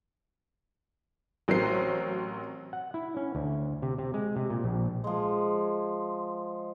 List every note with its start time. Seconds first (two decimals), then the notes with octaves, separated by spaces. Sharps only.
1.48 A1 F#3 C4 A#4 C5 C7
2.73 F#5
2.94 E4
3.17 C#4
3.35 D2
3.82 C3
3.98 C3
4.14 G#3
4.36 C3
4.50 A#2
4.64 A#1
5.04 F3 G#3